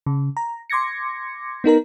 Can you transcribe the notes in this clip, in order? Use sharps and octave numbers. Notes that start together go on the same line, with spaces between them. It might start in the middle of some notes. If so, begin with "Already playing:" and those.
C#3
A#5
C6 D6 G#6 A#6 C#7
B3 D#4 A#4 A#5